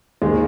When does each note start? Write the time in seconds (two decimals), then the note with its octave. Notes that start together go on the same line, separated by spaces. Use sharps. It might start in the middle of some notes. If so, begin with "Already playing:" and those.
0.22 D#2 D#3 G#3